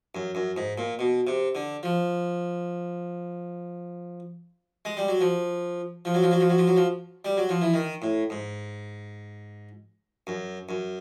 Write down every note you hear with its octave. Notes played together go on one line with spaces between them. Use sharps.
F#2
F#2
G#2
A#2
B2
C3
D3
F3
G#3
G3
F#3
F3
F3
F#3
F3
F#3
F3
F#3
F3
F#3
F3
G3
F#3
F3
E3
D#3
A2
G#2
F#2
F#2